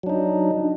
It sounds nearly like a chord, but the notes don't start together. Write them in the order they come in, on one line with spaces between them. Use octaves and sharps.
F#3 D4 D#4